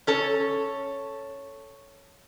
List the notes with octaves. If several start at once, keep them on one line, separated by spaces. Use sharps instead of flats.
C#4 A4 C#5